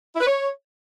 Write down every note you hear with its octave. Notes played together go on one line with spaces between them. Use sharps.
E4
B4
C#5